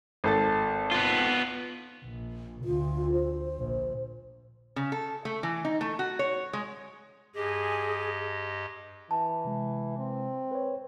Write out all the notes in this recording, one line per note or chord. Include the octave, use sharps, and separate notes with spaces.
G#1 A4 A6
B3 F4
A#1
D2 F4
C5
A#1
C#3
A4
A3
E3
D#4
A3
F#4
C#5
G#3
G2 G4 G#4 D#5
E3 A5
C3 G#3
C4
B4 C#5